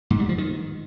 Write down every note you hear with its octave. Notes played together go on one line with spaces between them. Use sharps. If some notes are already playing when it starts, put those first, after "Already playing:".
G#2
G3
F3
D#3